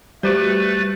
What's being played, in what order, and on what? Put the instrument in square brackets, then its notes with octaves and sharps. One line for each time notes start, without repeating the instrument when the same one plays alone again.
[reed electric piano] G3 [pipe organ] A3 B4 A6 [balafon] F#4 G4 C5